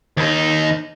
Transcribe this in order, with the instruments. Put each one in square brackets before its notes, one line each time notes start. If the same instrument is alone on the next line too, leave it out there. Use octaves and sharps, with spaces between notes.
[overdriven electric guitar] D#2 D#4